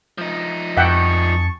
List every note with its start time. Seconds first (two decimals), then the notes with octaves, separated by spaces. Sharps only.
0.18 F3 D#4
0.77 F2 G#4 E5 F#5 G5 A5 C#6